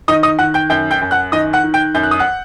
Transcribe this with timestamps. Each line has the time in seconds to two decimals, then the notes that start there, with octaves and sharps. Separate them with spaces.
0.08 D#3 D#5 D#6
0.23 D#5 D#6
0.39 D#3 F#5 F#6
0.54 G5 G6
0.70 F#2 G5 G6
0.91 G5 G6
1.01 F#2
1.11 F#5 F#6
1.32 D#3 D#5 D#6
1.53 F#5 F#6
1.63 D#3
1.74 G5 G6
1.94 F#2 G6
2.03 F#6
2.11 D#6
2.19 F#5 F#6